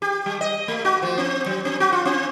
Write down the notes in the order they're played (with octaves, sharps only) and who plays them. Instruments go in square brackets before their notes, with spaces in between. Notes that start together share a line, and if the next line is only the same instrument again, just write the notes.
[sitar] G4
G3
D#5
A3
F#4
F3
C4
F#3
C4
F#4
F4
C4